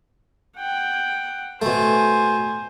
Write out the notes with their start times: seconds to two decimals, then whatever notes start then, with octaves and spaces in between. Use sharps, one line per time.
0.57 F#5 G5
1.62 B2 A3 C5 G#5